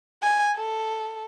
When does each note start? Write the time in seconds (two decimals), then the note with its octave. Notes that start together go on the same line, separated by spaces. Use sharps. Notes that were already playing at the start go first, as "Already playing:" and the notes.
0.22 G#5
0.56 A4